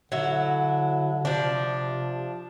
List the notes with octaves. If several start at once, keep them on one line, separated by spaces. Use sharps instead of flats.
D3 F#3 E4
C3 F3 D4